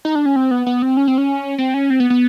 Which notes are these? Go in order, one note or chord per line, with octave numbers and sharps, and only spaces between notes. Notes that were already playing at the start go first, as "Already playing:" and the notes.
D#4
D4
C#4
C4
B3
B3
C4
C#4
C4
C#4
C4
C#4
C4
B3
B3